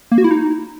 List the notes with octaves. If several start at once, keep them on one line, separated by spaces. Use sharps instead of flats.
A#3
F#4
E4
D#4